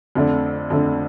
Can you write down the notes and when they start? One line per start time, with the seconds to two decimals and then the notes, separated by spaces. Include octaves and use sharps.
0.15 F2 D3 A3 D4
0.70 F2 D3 A3 D4